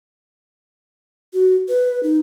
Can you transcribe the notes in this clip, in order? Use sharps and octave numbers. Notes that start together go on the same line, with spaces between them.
F#4
B4
D#4